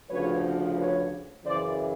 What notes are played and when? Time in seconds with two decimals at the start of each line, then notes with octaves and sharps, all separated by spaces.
0.10 D2 C#3 F3 B4 C#5
0.78 B4 C#5
1.45 F#2 C#3 E3 C5 D5